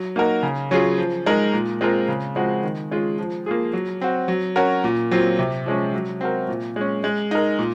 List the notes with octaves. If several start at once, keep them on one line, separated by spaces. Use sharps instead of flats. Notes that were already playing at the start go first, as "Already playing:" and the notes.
Already playing: F#3
A#3 D#4 F#4 A#4
C#3
F#3 C#4 F4 G#4
F3
G#3 D#4 A#4
A#2
G#3 C4 F4 A#4
C#3
F3 G#3 C4 F#4
D#3
G#3 C#4 F4 G#4
F3
A#3 F4 G#4
F#3
C4 F#4
F#3
C#4 F#4 A#4
A#2
F#3 C4 F4
C3
F3 G#3 C#4
F#3
C4 F#4 A#4
A#2
G#3 C#4
G#3
D#4 A#4
A#2